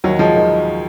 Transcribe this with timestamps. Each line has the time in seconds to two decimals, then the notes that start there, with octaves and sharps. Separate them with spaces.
0.04 D#2 F#3
0.19 F3 G#3
0.35 D#3